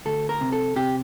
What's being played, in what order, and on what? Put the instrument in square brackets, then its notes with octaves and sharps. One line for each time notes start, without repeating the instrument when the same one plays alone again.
[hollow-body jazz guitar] D2 A4
A#4
C3
A4
C3 G4